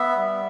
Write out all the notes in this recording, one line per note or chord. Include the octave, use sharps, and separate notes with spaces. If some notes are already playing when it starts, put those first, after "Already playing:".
Already playing: B3 E5
G3